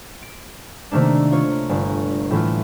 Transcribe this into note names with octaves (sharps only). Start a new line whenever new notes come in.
D7
C3 D#3 A3 A#3 D4
F4 C#5
G1
A2 E3 A3 F4